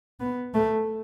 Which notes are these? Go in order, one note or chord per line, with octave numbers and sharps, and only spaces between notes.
B3
A3